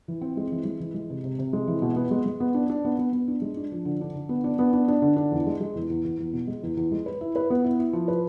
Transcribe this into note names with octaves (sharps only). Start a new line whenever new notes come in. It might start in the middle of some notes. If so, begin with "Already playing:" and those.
E3
C4
G#3
E3
G#3
E3
G#3
C3
C3
C3
G#3
E3
B2
B3
G#3
G#3
B3
D4
D4
B3
B3
B3
D4
G#3
D4
F3
D3
D4
D3
B3
D4
B3
D4
D4
D3
D4
E2
G#3
G#3
E2
E2
E2
E2
B2
G#3
E2
E2
G#3
B4
E4
B4
B3
E4
E4
F3
B4